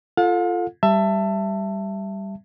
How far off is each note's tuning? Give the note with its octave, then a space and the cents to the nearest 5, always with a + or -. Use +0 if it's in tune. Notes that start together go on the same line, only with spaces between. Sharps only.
F4 -15 A4 +0 F5 +45
G3 +0 E5 +20 A5 +15